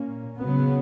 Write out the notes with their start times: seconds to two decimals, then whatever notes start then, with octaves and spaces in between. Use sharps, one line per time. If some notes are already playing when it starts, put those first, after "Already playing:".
Already playing: A#2 A#3 C#4
0.39 C#3 F#3 B3